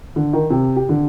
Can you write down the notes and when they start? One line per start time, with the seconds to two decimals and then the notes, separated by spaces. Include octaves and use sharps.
0.16 D3
0.33 D#3
0.50 C3
0.76 G4
0.89 D3